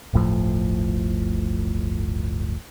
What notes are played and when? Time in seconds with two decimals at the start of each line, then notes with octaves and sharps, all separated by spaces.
0.13 D1 G1 A2 F3